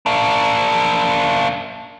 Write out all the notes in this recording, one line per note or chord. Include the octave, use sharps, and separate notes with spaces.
A#3 D4